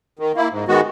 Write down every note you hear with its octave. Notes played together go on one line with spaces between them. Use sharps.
D#3
A#3 E4
G#2
D#3 G#3 B3 F#4